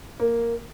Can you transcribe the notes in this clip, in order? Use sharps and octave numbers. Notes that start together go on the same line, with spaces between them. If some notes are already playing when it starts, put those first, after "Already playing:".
A#3